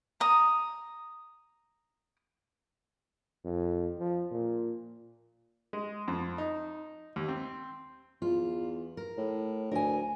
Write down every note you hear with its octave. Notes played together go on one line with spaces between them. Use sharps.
A#5 D#6
F2
F3
A#2
G#3
F2
D#4
D#2
C4
E2 F4
A#4
A2
D2 A#4 G#5